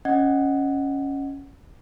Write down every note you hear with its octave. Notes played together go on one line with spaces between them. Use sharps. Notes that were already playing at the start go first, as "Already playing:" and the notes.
C#4 D#5 F#5 G#6